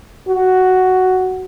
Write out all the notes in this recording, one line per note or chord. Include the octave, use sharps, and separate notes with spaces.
F#4